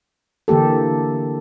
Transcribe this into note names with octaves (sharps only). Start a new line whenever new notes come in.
D3 E3 A#3 G4 A4